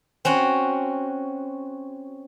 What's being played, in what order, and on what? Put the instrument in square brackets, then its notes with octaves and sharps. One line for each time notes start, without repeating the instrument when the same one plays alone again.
[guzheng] C4 C#4 F#4